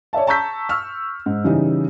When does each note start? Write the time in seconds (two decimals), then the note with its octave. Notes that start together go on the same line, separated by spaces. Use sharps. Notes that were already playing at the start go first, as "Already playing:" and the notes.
0.13 C#5 D5 E5 A5
0.27 A5 A#5 C#6 E6 G6 B6
0.69 C#6 E6 F6
1.26 G#2
1.44 C#3 E3 G3 D#4